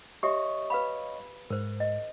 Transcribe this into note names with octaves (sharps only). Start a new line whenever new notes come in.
G4 C#5 D#5 E5 C#6
B4 F5 B5
G#2 A#4 C5
D#5